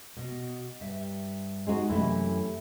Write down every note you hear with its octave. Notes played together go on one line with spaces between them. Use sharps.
B2
G2 E5
G#3 D#4 F#4
F#2 C3 E3 A3 E4